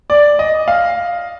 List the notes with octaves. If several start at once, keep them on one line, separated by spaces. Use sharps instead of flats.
D5
D#5
F5